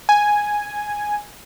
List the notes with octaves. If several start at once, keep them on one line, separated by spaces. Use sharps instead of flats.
G#5